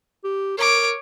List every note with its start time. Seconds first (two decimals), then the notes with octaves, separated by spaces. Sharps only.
0.24 G4
0.58 A#4 C#5 D6